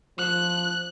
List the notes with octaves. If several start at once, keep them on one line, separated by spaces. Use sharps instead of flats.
F3 F#6